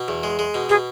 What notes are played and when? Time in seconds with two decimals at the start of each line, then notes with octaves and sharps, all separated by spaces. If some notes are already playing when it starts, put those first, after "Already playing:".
Already playing: B2
0.08 E2
0.23 G#3
0.39 G#3
0.54 B2
0.69 B2 G#4